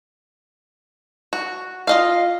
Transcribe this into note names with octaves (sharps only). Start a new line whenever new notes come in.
F#4
F4 D#5 F5